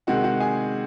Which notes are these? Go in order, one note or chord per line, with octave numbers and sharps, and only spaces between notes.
C3 D#3 G#3 F#4 F#5
F#4 F#5
G#4 G#5